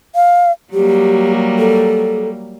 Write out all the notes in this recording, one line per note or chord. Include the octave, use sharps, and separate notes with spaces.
F5
F#3 G3 A#3 G4
A4